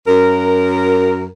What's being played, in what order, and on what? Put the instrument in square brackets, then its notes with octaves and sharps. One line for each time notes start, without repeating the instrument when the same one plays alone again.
[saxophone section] F#2 A#4